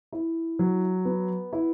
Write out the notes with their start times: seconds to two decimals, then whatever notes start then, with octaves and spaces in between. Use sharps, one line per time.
0.12 E4
0.59 F#3
1.05 B3
1.53 E4